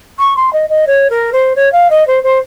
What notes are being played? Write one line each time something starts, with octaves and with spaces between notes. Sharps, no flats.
C#6
C6
D#5
D#5
C#5
A#4
C5
C#5
F5
D#5
C5
C5